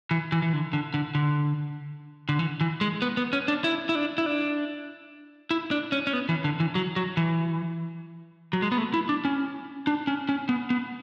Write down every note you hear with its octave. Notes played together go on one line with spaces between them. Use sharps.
E3
E3
E3
D3
D3
D3
D3
D3
E3
E3
G#3
B3
B3
C#4
D4
E4
E4
D4
E4
D4
E4
D4
C#4
C#4
B3
E3
D3
E3
F#3
F#3
E3
F#3
G#3
B3
A3
E4
D4
C#4
D4
C#4
C#4
B3
B3